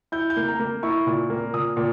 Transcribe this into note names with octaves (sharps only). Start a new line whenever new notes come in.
E4 G6
G6
A#3
A#5
A#3
E4 C#6
A#2
A#3
A#2 D#6
A#2